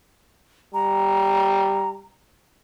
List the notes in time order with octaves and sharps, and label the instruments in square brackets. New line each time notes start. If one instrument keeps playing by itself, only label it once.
[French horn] G3 [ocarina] A#5